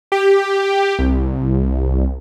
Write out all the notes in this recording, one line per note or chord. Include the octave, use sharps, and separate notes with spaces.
G4
C2